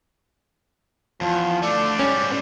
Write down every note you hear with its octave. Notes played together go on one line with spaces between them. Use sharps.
E2 F3
A3 D4 D5
G#2 G3 C#4